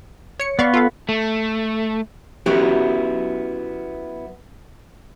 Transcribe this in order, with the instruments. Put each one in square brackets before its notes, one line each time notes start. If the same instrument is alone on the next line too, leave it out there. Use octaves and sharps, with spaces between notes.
[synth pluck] C#5 C#7
[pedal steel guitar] B3 [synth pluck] D5 F5 C#6
[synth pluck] F4 A4 F5
[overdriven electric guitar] A3
[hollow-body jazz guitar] F#3 B3 C#4 E4 F#4 G4